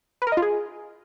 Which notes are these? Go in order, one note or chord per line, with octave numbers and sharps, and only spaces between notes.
B4
A#4
D#5
F4
G#4